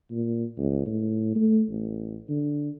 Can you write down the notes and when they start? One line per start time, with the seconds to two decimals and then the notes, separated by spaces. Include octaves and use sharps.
0.11 A#2
0.58 C#2
0.86 A2
1.35 A3
1.69 A1
2.29 D3